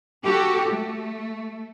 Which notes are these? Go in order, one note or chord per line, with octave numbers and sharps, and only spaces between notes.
F#4 G4 A4
A3